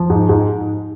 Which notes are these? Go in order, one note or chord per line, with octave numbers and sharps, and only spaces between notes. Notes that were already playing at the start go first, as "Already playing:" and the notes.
Already playing: F3
G#2
G#2